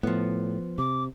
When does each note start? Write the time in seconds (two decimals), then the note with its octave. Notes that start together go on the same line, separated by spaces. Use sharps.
0.03 A2 F3 B3
0.78 C3 D6